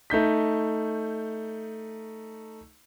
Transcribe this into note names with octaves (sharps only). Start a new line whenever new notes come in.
A3 D#4 G6 B6